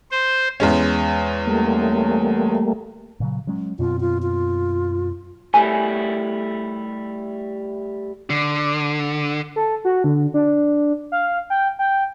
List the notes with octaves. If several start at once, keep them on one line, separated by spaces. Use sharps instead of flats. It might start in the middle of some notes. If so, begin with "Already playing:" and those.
C5
E2 G#3 C#4
G3 A3 A#3
A#2 C#3 F#3
F#3 G#3 C#4
F#2 B2 C4 F4
F4
F4
G3 A3 E4 G#5
D3
A4
F#4
D3
D4
F5
G5
G5